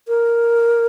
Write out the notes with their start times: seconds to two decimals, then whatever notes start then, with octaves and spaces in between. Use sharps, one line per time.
0.08 A#4